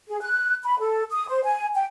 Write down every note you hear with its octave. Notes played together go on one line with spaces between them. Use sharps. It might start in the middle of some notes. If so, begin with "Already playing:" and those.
G#4
F#6
B5
A4
D#6
C5
G#5
G5